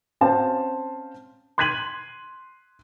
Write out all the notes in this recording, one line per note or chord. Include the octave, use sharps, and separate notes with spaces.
C4 C#4 F#4 C5 F5 A5
C6 F#6 G#6 B6 D#7 F#7